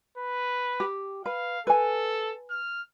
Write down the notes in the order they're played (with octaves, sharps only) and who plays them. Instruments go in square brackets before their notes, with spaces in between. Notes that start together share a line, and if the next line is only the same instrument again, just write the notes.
[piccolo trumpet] B4
[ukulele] G4
[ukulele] B4 [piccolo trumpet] F5
[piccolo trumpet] A4 [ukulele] B4 G#5
[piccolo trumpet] F6